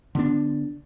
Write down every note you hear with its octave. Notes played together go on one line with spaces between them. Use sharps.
D3 B3 D4